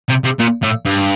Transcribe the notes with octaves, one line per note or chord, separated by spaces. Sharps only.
C3
C3
A#2
A2
G2